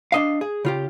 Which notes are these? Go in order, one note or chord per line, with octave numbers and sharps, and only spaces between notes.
D4 D#5 F5
G#4
C#3 F4 G4